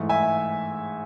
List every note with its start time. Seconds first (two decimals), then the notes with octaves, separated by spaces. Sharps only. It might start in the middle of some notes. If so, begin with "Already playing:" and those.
Already playing: G#2 E3 A3
0.09 E5 G#5